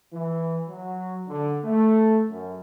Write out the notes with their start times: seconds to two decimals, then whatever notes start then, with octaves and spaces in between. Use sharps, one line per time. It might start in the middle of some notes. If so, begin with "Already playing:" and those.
0.13 E3
0.69 F#3
1.29 D3
1.65 A3
2.30 F#2